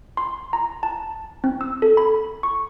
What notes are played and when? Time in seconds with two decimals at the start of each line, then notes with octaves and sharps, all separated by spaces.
0.17 C6
0.53 A#5
0.83 A5
1.44 C4
1.61 E6
1.82 A4
1.97 B5
2.43 C#6